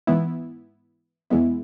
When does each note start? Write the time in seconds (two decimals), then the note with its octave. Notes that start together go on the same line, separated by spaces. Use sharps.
0.07 G#2 E3 B3 E4
1.30 E2 E3 G#3 B3 E4